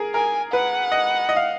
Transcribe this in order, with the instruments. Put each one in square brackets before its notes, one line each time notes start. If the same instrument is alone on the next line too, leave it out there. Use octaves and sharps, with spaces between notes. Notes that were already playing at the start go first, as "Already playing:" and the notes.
Already playing: [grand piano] G#4 A#4
[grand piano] A#4 [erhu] G#5
[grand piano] B4 [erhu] F#5
[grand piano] D#5
D#5
F5